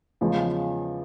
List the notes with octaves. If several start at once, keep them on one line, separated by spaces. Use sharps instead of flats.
E2 C#3 F3 G#3